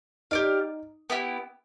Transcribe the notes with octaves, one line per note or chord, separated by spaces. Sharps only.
D#4 G4 A#4 D5 F5
B3 E4 G4